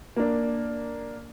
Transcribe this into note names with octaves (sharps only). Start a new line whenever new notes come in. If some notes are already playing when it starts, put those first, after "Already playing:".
A#3 D4